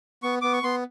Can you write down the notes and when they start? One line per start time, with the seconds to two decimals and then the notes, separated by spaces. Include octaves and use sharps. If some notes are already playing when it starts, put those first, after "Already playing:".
0.23 B3 C#6
0.42 B3 D6
0.53 C#6
0.63 B3 C6